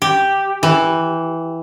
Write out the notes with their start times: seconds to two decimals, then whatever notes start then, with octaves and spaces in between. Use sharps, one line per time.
0.02 G4
0.63 E3